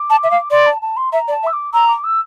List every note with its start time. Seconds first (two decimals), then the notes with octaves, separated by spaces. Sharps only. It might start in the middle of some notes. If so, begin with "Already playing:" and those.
Already playing: D6
0.10 A5
0.23 E5
0.31 F5
0.51 D5 C6
0.67 A5
0.82 A5
0.97 C6
1.12 E5 A#5
1.28 D5
1.32 A5
1.43 E5
1.47 E6
1.53 D6
1.73 A#5 E6
1.88 D6
2.04 E6